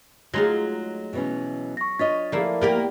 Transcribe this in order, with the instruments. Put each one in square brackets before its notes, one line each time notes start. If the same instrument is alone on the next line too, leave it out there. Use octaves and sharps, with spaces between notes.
[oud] F#3 [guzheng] G#3 D#4 F4 [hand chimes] A3 C6 A#6
[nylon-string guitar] B2 E3 C#4
[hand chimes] C#6 A#6
[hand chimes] D4 A6 B6 [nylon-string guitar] F4 C#5 D#5
[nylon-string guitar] F3 [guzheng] A3 A#3 E4 [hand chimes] D5
[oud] A#3 G4 A#4 [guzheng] B3